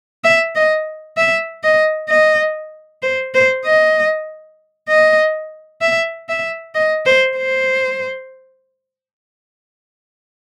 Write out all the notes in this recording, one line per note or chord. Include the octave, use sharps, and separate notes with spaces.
E5
D#5
E5
D#5
D#5
C5
C5
D#5
D#5
E5
E5
D#5
C5
C5